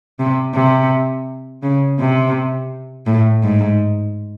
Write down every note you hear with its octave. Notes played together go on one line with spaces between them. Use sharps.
C3
C3
C#3
C3
A2
G#2